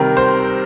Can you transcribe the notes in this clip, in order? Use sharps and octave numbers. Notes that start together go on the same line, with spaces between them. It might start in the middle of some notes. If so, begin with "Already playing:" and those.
Already playing: C3 D#3 G3 A#4
C5